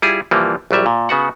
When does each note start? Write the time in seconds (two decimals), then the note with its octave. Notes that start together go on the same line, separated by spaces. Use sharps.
0.02 G3 E4 F4 G#4
0.31 C2 E3 F3 G3 A#3
0.71 A#1 F#3 G3 E5
0.86 A#2
1.09 C#3 B3 F#4 F#5